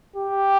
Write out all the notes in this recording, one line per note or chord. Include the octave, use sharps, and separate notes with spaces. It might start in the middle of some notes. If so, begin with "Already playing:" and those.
G4